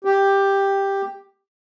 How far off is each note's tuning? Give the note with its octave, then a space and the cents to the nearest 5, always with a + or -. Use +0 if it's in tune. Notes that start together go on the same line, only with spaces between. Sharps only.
G4 +5